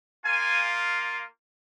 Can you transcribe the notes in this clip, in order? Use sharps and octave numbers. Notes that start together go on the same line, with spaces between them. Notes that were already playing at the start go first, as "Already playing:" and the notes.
A#3 F4 G#5